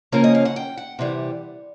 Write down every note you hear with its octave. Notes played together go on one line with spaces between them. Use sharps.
C#3 F3 A#3 C#4 A#4
D#5
F5
F#5
G5
F#5
C3 E3 G3